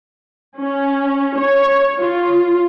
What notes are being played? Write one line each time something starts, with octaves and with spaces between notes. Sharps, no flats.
C#4
C#5
F4